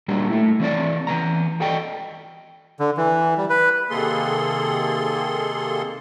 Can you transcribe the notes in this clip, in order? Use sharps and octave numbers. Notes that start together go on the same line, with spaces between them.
A#2 G3 D4 F#4 A#4
A3 E4
E3 C4 C#5 D5
E3 B3 A#5
F#4 A4 D5 D#5 G5
D3
E3
G3
B4
C3 D#3 A#3 G#4 A4 C6